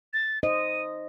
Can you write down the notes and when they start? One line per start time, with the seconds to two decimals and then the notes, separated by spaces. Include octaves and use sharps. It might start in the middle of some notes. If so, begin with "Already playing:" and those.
0.13 A6
0.43 D#4 C5 D#5 D#7